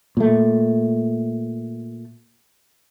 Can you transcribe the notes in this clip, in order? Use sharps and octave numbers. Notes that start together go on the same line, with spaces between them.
A#2 A3